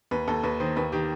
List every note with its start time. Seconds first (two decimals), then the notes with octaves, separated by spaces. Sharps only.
0.11 D#2 B4
0.28 D#2 A4
0.43 D#2 B4
0.60 D#3 C5
0.76 D#2 B4
0.92 D#3 G4